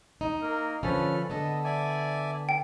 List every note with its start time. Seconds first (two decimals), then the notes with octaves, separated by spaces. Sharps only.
0.21 D#4
0.42 A#3 A#4
0.83 D3 F3 C#4 A4 B4 F6
1.30 D3 B3 A4 D#5
1.64 D5 E5 G#5
2.49 G5